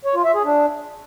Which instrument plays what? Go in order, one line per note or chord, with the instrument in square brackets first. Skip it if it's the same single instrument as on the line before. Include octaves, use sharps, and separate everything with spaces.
[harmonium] C#5
F4
E5
G#4
D4